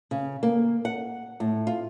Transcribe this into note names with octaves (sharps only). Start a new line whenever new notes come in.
C#3
A#3
F#5
A2
F4